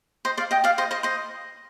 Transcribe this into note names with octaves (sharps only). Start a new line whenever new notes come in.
C5 D#5
D5 F5
D#5 G5
D5 F5
C5 D#5
C5 D#5
C5 D#5